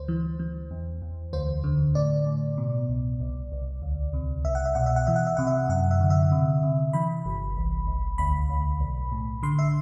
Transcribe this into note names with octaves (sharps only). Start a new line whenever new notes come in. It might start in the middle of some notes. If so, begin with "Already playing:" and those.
Already playing: D2 C5
E3
E3
E2
E2
D2 C5
D3
A2 D5
A2
B2
C2
C2
C2
D2
C3
C2 E5
F#5
E5
B2 F#5
E5
F#5
E3 E5
F#5
E5
C3 F#5
E5
F#2 F#5
E5
D3
E5
C3
C3
E3 B5
G1
C2
C2
D2 B5
D2
B1
A2
D3 C6
E5